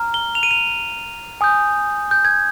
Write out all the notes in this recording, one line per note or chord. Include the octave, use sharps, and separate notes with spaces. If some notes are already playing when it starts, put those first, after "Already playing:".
Already playing: A#5 F6
G7
F7
D#7
F7
G#5 D#6 G6
G6
G#6